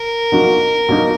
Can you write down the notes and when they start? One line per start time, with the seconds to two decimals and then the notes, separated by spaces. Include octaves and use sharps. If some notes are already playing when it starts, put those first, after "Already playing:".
Already playing: A#4
0.32 B2 F#3 A#3 D#4 F#4
0.89 B2 F#3 A#3 D#4 F#4